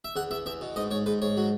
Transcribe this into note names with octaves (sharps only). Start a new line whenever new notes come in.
E5
E2 F#5
E2 E5
E2 E5
B2
G#2 D#5
G#2 C#5
G#2 B4
G#2 C#5
F#3